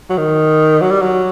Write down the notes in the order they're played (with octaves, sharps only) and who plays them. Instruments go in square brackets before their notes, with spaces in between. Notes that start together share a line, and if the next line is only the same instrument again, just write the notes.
[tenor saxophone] F#3
D#3
F#3
G3
F#3